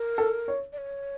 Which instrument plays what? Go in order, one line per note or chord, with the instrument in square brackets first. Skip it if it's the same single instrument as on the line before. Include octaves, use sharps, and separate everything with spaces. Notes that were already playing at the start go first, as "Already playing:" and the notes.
Already playing: [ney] A#4
[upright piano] A4
C#5
[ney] D5
C#5